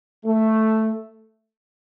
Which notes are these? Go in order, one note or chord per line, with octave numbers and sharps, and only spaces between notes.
A3